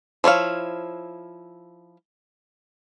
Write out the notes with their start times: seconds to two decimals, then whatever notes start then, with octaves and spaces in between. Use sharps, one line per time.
0.24 F3 E4 C#5 F5